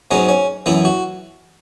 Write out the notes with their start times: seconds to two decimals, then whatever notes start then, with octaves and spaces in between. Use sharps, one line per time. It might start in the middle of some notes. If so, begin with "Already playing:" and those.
0.11 G#2 F#3 B3 C#4
0.29 C#4
0.66 F#2 E3 B3 E4
0.85 F#4